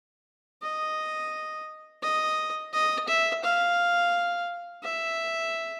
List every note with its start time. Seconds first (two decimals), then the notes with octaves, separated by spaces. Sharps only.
0.62 D#5
2.02 D#5
2.73 D#5
3.08 E5
3.44 F5
4.83 E5